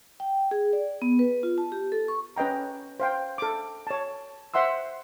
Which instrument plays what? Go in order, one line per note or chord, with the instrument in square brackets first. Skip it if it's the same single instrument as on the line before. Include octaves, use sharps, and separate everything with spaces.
[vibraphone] G5
G#4
D5
B3
B4
F4
A5
G4
A4
C#6
[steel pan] C#4 B4 D#5 G5 A#5
C5 F5 G5
A4 D6
C#5 A5
C5 E5 F#5 C6 E6